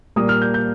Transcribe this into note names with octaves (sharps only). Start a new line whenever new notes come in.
A#2 G3 A#3 D#6
F6
G6
G6